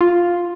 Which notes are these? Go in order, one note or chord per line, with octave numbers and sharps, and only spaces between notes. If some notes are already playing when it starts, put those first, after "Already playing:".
F4